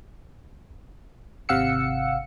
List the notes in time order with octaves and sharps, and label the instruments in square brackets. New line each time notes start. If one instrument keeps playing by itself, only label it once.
[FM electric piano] G#1 C3 F5 F#5 E6 C#7